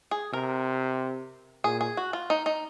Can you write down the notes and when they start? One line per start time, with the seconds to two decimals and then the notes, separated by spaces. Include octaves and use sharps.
0.11 G#4
0.33 C3 A#4
1.64 A#2 G#4
1.81 G#4
1.97 F#4
2.13 F4
2.30 D#4
2.46 D#4